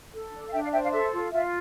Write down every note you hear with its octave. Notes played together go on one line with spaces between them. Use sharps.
A4
D4
F5
D4 E5 G5
D5 F5
C5 E5 G5
D5 F5
A4 E5
F4
F4 E5